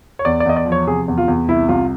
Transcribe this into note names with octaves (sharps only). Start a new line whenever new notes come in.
C#5
E2 D5
D5
E2 D#5
D5
F3
C#5
C3 G#4
E2
F4
E2
C2 E4
C2 F4